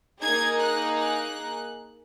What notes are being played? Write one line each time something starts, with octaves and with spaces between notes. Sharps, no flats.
A#3 D#4 G#4 G#6
F#6
F#6